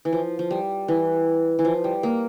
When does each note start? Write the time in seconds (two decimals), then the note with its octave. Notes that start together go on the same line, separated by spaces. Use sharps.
0.05 E3
0.13 F3
0.39 F3
0.50 G3
0.88 E3
1.59 E3
1.65 F3
1.84 G3
2.03 A#3